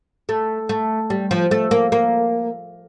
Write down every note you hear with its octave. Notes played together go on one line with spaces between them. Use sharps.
A3
A3
G3
F3
A3
A#3
A#3